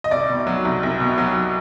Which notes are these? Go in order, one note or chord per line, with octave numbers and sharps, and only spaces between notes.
D#5
C2 D5
B2
F#3
C2
C2
B2
F#3